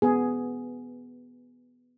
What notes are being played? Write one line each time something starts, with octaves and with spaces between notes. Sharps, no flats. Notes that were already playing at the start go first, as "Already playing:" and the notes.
B3 G#4